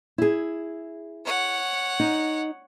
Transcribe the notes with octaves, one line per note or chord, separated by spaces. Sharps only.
E4 G#4
C#5 F#5
D#4